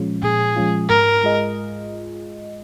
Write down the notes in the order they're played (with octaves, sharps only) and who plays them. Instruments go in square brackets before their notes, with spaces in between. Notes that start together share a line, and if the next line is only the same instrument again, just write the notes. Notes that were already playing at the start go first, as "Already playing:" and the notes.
Already playing: [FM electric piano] A#2 F3 G#3 C#4 F4
[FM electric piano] A#2 [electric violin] G#4
[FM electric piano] F3 G#3 C#4 F4
[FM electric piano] G#2 [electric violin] A#4
[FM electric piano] G#3 F4 G#4 D#5